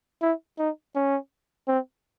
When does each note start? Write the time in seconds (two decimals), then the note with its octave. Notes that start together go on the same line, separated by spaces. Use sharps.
0.22 E4
0.59 D#4
0.95 C#4
1.67 C4